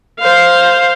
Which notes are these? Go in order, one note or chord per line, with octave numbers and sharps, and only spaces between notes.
C5 F5